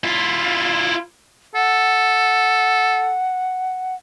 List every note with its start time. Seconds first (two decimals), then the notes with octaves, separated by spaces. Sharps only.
0.04 E4 F4
1.55 A4 F#5